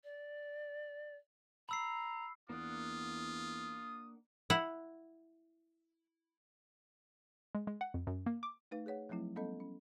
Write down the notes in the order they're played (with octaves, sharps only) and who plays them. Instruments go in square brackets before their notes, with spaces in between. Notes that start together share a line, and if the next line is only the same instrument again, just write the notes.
[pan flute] D5
[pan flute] A#5 [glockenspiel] B5 E6 C7
[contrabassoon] E2 [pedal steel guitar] A#3 D4 F#5 [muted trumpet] F4 [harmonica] D#6
[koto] E4 F#5
[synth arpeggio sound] G#3
G#3
F#5
F2
F#2
A#3
D6
[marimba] A3 D#4 B4 F5
G#4 B4 C#5 F#5
F3 F#3 A3 C4 E4
G3 B3 C#4 A4 D#5
C#4